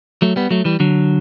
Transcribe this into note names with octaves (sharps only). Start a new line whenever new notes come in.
F#3 A3
G3 B3
F#3 A3
E3 G3
D3 F#3